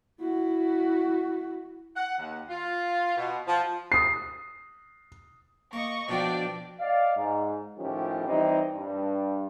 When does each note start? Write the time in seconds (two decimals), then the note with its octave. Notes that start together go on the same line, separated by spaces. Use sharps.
0.20 E4 F#4
1.96 F#5
2.17 D#2
2.48 F4
3.16 B2
3.47 F3
3.92 D#6 C7
5.73 A#3 D#5 C#6
6.09 B2 F3 D4 D5 G5
6.80 D5 D#5 F5
7.16 G#2
7.78 A2 D#3 F3 C#4 G4
8.27 E3 G3 C4 D#4 D#5
8.75 G2